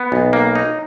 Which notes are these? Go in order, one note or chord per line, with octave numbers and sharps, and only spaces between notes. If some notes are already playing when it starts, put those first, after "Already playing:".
Already playing: B3
B1
A#3
D#4